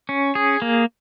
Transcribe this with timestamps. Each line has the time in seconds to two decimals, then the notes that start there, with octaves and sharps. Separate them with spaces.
0.09 C#4
0.35 G#4
0.62 A#3